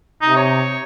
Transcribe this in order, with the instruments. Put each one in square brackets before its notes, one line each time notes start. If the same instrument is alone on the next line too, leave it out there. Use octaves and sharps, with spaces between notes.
[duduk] C3 [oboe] D#4
[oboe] C#5